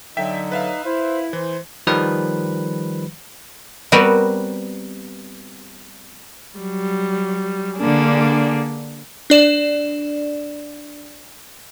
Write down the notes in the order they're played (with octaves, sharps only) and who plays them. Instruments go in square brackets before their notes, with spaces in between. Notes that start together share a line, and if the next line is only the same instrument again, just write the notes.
[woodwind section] D3 F#3 [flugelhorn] D#4 [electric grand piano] E5 G5 B6
[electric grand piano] B4 E5 F5
[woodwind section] E4 [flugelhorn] C5
[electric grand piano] E3 [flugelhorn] C5
[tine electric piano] D#3 F3 G3 B4
[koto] G3 B3 C4 F#4 A#4 B4
[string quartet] F#3 G3
D3 A#3 D4 G#4
[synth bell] D4 D5 E7